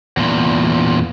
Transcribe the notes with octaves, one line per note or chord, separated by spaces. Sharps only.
E2 A#2